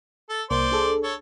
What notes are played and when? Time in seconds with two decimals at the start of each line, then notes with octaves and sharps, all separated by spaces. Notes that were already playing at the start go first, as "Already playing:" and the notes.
0.29 A4
0.50 C2 A#3 C5 D5
0.71 D4 G#4 A4
1.03 A4 C#5